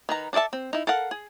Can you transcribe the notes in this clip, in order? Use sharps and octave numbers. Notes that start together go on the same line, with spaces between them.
D#3 B4 A#5
D4 A4 D5 E5 A5
C4
D#4 E4
A4 A#4 F5 F#5
G#4